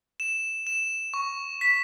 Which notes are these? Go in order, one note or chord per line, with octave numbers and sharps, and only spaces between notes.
E7
E7
C#6
B6